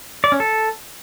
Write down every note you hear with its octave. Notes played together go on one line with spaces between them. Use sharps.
D5
C#4
A4